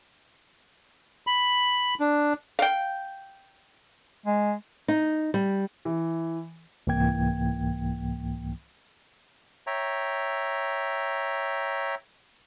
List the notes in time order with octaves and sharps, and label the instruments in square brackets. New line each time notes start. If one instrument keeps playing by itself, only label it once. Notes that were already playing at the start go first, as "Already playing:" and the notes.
[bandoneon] B5
D4
[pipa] F5 G5
[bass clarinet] G#3
[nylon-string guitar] D#4
G3
[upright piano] E3
[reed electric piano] C2 G#2 E3 A#3 G5 G#6
[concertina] C#5 E5 G5 A#5